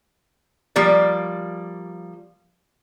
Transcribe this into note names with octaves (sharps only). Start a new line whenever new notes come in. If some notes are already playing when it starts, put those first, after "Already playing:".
F3 G3 A#3 D5